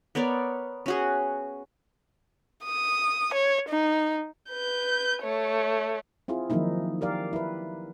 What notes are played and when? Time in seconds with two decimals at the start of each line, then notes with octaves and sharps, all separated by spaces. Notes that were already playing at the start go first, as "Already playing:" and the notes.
0.15 B3 A#4 C#5 D5
0.86 C#4 F#4 G#4
2.64 D#6
3.34 C#5
3.69 D#4
4.50 B4 G6
5.22 A3 C#5
6.28 C4 E4 F4 G#4
6.50 D#3 F3 F#3 A#3 D#4 E4
7.01 G4 A#4 D5 F5
7.33 E4 B4